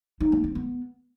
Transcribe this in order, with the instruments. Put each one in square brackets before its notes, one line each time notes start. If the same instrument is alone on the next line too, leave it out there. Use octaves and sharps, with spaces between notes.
[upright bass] D#4
A#3
C4
B3